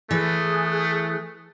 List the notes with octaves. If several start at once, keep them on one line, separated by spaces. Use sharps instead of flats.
E3 A3 G#4 B4 D#6 F#6